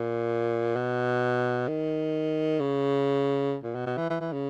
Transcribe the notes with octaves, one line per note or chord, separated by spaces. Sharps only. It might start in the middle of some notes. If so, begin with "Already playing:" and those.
Already playing: A#2
B2
D#3
C#3
A#2
B2
B2
E3
E3
E3
C#3